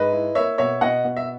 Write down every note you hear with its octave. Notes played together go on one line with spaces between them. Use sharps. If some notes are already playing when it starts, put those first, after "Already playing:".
Already playing: G#2 B4 D#5
E4
A#3 C#5 E5
B2 C#5 E5
B2 D#5 F#5
B2
E5